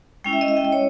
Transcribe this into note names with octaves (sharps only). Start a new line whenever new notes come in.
G#3 C#4 E4 G5
E5
D#5
E5
G5
D#5
C#5